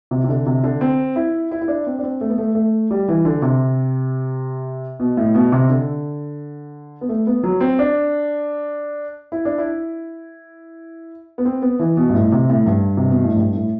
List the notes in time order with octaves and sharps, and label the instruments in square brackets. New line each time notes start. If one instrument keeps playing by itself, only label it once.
[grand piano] C3
C3
D3
C3
D3
C4
E4
E4
E4
D4
C4
D4
C4
A3
B3
A3
A3
G3
E3
D3
C3
B2
A2
B2
C3
D3
B3
A3
B3
F#3
C4
D4
E4
D4
E4
B3
C4
B3
E3
B2
G2
A2
C3
A2
G2
C3
B2
A2
G2
A2